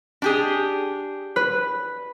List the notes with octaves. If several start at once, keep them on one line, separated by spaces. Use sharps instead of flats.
D4 G4 G#4
B4